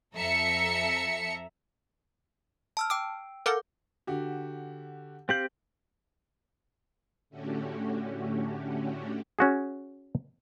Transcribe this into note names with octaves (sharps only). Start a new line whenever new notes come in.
F2 A4 E5 A#5 C#7
A5 E6 F6
G5 D6 E6 D7
A4 A#4 F5 F#5 D6 G6
D3 F#4 G4
C4 G4 F5 G6 F#7
A2 D3 A3 C#4 F#4 G4
C#4 F#4 G#4